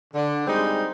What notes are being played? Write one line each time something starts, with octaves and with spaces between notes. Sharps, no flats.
D3
G3 G#3 C4 D#4